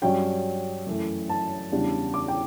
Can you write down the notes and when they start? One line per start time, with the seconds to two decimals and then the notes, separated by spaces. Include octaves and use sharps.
0.02 G2 F#3 C#4 G5
0.87 F#2 E3 A3
1.29 A5
1.72 E2 C#3 G3 D4
2.14 D6
2.28 G5